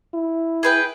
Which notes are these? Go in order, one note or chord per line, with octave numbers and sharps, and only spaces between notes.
E4
G#4 B4 G5